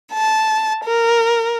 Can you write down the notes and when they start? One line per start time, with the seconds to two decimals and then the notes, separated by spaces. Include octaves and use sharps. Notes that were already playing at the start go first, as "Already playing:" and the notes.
0.13 A5
0.84 A#4